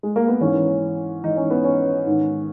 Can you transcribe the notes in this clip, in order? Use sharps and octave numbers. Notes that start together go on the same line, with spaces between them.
G#3
A#3
B3
G#2 E3 C#4
G#2 E3 D#4
C#4
B3
C#4
G#2 D#3